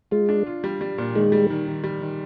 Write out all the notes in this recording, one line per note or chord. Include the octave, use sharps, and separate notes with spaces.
G#3 F4
D4
F4
G3
G3
A#2
D#3 G#3
G3
D#3
D#3
G3
D#3